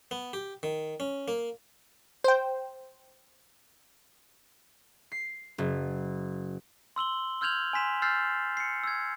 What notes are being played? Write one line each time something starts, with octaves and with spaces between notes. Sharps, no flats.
B3
G4
D#3
C#4
A#3
C5 G5
C7
F#1
C6 E6 F#7 G7
E6 F6 G6 G#6 F7 F#7
G#5 C6 B6 E7
E6 F6 G6 A6 C7
C7 C#7
E6 G#6